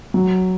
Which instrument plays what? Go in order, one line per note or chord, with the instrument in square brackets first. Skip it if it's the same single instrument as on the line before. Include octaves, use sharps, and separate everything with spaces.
[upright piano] F#3